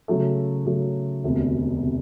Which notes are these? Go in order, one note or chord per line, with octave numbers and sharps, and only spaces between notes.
C#3 F#3 A3
C#3 F#3 A3
E1 D2 C3
C3